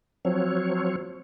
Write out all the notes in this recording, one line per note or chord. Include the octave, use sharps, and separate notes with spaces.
F3 F#3 C4 C#5